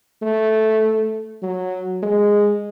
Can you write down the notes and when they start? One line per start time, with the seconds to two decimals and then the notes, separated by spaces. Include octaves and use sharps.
0.22 A3
1.43 F#3
2.02 G#3